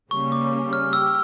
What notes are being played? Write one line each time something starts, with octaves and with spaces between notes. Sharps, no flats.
C#3 G3 A#3 C#4 C#6
D6
F6
G4 E6